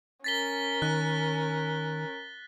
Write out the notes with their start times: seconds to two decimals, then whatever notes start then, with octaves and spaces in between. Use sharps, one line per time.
0.24 C#4 A#4 A6 B6 G7
0.82 D#3 F#6